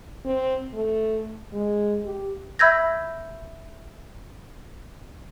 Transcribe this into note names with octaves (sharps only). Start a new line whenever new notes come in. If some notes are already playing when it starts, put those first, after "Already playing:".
C4
A3
G#3
G4
E5 B5 E6 G6 G#6 A#6